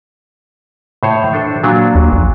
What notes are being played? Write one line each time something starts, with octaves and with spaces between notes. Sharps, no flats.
A2 C5 C#5
D4 A4 C5
A#2 F#3 D4
D#2
A#1